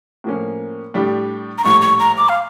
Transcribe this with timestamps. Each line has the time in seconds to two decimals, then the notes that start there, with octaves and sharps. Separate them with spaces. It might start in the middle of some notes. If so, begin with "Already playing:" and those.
0.24 A2 F3 A#3 C#4
0.94 A2 G3 D4 G4
1.58 A#5
1.64 A#1 A2 G3 C#6
1.82 C#6
2.00 A#5
2.17 D6
2.29 F5